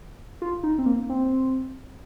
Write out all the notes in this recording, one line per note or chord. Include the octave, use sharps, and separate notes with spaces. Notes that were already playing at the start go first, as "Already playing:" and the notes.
F4
D#4
C4
A#3
C4